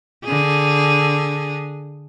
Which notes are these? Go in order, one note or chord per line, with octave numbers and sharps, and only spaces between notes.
D3 G#4